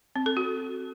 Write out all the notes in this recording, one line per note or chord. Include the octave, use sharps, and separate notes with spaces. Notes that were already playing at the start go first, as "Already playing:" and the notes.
C4
A4
F#4